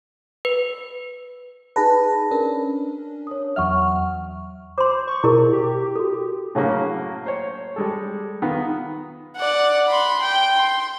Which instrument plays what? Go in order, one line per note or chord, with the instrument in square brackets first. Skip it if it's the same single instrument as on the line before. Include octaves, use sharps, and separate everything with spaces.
[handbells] B4
[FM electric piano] D#4 G#4 B4 [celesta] A5 A#6
[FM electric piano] C#4 D4 [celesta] A#4
[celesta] C#5 D#6
[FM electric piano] E2 F#3 F6 [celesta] E5 F#5 C#6
[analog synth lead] C5 [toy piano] C6 D6
[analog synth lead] C#6
[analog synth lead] B2 [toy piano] E4 G#4 A#4
[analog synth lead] G4
[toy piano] F#4 A4
[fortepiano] A2 C#3 F#3 A#3 C#4
C5 C#5
G3 G#3 A4
D#3 B3 F4
[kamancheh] D5 F#5
B5 C6
G5
C6